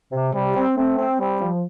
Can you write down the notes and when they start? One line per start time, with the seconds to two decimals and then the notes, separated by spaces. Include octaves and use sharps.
0.12 C3
0.34 C3 G3
0.56 C4
0.77 A3 C4
0.98 C4
1.20 G3 C4
1.41 F3